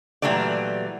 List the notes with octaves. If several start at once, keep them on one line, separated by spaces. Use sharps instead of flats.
A#2 E3 F#3 G3 A3 D5